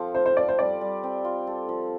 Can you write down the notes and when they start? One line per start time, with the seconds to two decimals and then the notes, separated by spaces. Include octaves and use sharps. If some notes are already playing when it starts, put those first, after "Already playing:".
Already playing: F3 C4 A4
0.15 F4 C5
0.26 C5
0.37 A4 D5
0.49 C5
0.59 G3 D5
0.81 G3
1.03 C4
1.24 F4
1.47 A4
1.69 F3